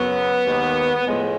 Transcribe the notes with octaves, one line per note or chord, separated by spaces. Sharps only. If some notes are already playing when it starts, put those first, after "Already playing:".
Already playing: F#2 C#3 F#3 B3
D#2 D#3 G#3
A2 F3 G#3